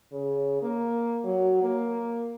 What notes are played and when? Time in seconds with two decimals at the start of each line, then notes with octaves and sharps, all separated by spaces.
0.12 C#3
0.62 A#3
1.24 F#3
1.62 A#3